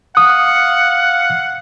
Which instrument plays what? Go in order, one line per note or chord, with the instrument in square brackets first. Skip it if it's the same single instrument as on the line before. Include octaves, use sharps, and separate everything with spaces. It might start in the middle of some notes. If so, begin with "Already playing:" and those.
[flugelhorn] F5 [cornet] F#5 [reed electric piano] D#6